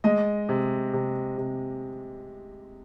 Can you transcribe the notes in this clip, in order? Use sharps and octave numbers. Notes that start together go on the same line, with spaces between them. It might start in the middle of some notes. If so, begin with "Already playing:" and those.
G#3 D#5
C3
C3
C3